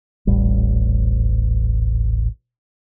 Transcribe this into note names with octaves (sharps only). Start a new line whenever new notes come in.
D#1 A1 G3